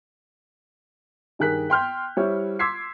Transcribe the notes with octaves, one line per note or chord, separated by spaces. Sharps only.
G2 D#3 G#4 A#4 F#6 B6
G5 C6 F6 G6
G3 E4 C5 C#5
C6 D6 E6 G#6 B6 C7